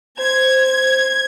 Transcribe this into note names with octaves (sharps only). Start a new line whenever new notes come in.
C5 G#6